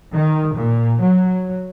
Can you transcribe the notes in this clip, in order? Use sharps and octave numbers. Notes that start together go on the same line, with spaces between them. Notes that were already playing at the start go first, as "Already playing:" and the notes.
D#3
A#2
F#3